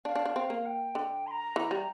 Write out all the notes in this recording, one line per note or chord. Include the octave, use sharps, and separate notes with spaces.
D4 F5
D4
D4
C4
A#3
G5
D3
C6
A#5
E3
G3